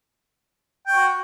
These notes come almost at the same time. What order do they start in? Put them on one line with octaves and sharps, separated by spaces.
G5 C#5 F#4